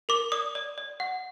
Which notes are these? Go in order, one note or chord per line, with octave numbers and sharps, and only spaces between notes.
A#4 D6
D5 D#6
D5
D5
F#5